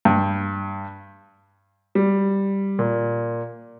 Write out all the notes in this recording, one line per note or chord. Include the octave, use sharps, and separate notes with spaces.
G2
G3
A#2